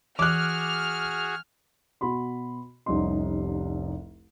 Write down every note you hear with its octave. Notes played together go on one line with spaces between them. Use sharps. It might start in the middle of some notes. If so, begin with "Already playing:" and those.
E3 F#4 G#4 D6 F6 F#6
B2 F#4 B5 C6
F1 C2 C#4 D#4 C6